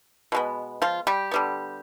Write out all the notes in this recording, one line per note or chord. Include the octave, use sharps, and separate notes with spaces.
B2 G#3 B3
F3 F4
G3 G4
D3 G3 B3